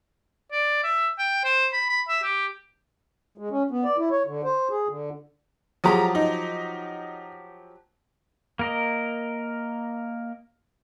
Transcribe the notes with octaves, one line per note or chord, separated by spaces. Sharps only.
D5
E5
G5
C5
B5
B5
E5
G4
G#3
C#4
B3
D5
E4
C#5
D3
C5
G#4
D3
F3 F#3 G#3 G4 A#5 D#6
D#4
A#3 A#4 D#5